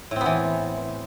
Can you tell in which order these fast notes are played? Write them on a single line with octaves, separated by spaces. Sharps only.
A2 C4 B3 E3